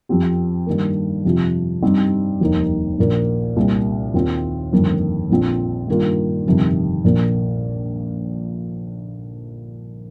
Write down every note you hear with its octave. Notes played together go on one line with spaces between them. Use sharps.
F2 F3 C4 G4
G2 D#3 A#3
F2 C3 F3
G2 G3 C4 D#4 G4
F1 D#2 D#3 A#3 D#4
A#1 A#2 A#3
C2 A#2 G3 C4
D#2 D#3 C4 F4
G1 F2 D#3 A#3
A#1 A#2 F3 C4
G2 D#3 A#3 F4
G1 F2 C3 D#3
A#1 A#2 A#3